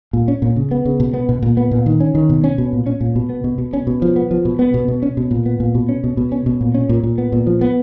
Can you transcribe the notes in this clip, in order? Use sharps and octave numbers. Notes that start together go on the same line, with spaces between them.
A#2
C#4
A#2
C#3
B3
C#3
B2
B3
B2
A#2
B3
A#2
D#3
C#4
D#3
B2
C#4
B2
A#2
C#4
A#2
B2
B3
B2
B2
C#4
B2
F3
B3
F3
B2
B3
B2
B2
C#4
B2
A#2
B3
A#2
B2
C#4
B2
B2
C#4
B2
A#2
C#4
A#2
A#2
B3
A#2
F3
B3